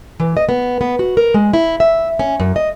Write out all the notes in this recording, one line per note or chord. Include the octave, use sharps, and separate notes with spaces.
E3
D#5
B3
B3
F#4
A#4
G#3
E4
E5
C#4
F#2
D#5